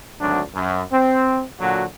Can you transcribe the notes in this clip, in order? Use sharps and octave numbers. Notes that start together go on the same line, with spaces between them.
G#1 D2 F#3 D4
F#2
C4
A#2 D3 F#3 F#4